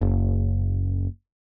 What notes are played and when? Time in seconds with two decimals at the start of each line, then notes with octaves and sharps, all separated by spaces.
0.01 F#1